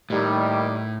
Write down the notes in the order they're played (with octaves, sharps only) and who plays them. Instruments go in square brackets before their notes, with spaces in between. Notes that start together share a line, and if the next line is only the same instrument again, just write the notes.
[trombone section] D#2 D#3 G3 [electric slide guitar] A2